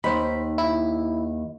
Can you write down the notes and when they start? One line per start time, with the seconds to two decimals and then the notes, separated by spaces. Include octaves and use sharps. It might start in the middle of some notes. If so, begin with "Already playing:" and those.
0.04 D#2 D#4 C5 B5
0.58 E4